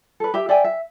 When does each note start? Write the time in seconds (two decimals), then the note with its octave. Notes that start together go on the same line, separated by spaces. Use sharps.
0.20 A4 B4
0.34 G4 E5
0.49 D5 E5 G5 G#5
0.64 E5